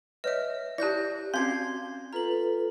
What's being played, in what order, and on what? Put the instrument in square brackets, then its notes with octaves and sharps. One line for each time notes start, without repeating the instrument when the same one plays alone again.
[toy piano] B4 C#5 E6 [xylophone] D#5 E5
[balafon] E4 G4 [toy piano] D5 A5 [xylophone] F#6 G6 A#6
[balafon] C4 C#4 F#4 [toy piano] F5 [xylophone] C6 G#6 C7
[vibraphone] F4 A4 B4 [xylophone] A#5 F#7